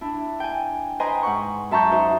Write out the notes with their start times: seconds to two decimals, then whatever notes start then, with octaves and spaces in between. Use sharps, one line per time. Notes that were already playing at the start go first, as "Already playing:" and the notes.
0.01 D4 E4
0.40 G5 G#5
1.00 B4 C5 D#5 G5 G#5 A#5
1.23 G#2 F#5 C#6
1.71 F#2 E5 A5 A#5 C#6 G6
1.91 D#4 F#4 C5